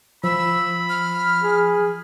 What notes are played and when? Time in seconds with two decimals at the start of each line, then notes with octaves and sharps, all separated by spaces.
0.24 F3 B5 E6
0.89 F6
1.42 G#4